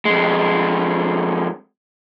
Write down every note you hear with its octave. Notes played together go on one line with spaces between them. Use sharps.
F2 G#3